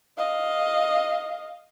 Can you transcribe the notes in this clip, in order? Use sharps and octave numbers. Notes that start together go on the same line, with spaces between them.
D#5 F5